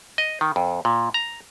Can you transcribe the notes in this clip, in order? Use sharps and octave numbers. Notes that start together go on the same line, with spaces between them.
D#5
D#3
F2
A#2
A#5